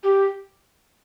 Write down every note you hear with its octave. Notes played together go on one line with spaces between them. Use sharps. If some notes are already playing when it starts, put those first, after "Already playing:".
G4